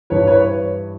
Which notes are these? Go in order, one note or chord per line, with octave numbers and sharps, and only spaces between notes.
G2 E3 B4 C#5
B4 C#5
C#5